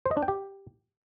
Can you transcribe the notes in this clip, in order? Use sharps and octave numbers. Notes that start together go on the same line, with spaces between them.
C5
D#5
D4
G5
G4